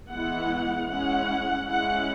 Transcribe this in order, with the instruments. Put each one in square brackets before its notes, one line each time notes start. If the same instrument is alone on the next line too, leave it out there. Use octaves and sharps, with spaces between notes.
[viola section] E3 G#3 B3 E4 F#5
G#3 C#4 E4 F#5
G#3 C#4 E4 F#5